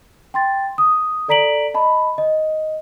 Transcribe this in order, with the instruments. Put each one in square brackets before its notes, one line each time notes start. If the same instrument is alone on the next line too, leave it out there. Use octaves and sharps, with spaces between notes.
[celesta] G5 C6 A6
D#6
A4 D5 A#5 B6 D7 F#7
D#5 A5 B5
D#5